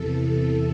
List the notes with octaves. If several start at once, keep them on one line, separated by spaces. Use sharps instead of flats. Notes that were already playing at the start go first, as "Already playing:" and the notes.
Already playing: E2 C3 E3 A4